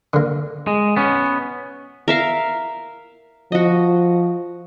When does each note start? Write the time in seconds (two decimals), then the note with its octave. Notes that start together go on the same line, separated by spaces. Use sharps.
0.14 D3 A#3
0.67 G#3
0.97 B3 C#4
2.08 A#4 E5 F5
3.52 F3 F#4 D#5